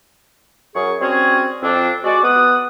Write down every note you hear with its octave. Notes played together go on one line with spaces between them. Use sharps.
F#2 G#4 C#6
G3 C4 C#4 F#4 G#4 C#5
F2 C4 D4
G#3 F#4 D5
B3 F#5 D#6